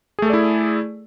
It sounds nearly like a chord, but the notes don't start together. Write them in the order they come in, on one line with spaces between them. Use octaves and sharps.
G#4 A3 A4 D5 E4